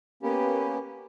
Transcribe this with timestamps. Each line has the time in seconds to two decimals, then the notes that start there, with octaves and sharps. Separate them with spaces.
0.23 A#3 B3 C#4 G4